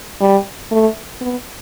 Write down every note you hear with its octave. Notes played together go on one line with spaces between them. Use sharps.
G3
A3
B3